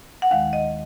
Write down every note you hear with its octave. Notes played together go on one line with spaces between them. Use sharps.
F#5
D#2 D#3 G#3 F5
D#5